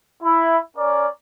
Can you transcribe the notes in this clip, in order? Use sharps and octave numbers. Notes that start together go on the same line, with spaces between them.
E4
C#4 A#4 D5